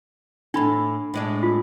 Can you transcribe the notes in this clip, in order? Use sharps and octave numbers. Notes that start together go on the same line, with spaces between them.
A2 D4 A4 B5
A2 G#3 D4
F4